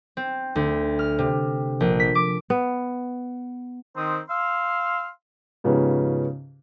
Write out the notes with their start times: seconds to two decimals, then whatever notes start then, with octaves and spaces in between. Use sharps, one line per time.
0.17 C4
0.55 D2
0.99 F6
1.19 C3
1.80 A#1
2.00 B6
2.15 D6
2.50 B3
3.96 D#3 C4 C5 D#6
4.29 F5 C6 E6 F6
5.64 G#2 C#3 F3 B3 C#4 G4